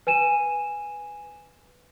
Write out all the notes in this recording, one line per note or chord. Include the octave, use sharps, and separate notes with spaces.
B4 G#5 D#7 E7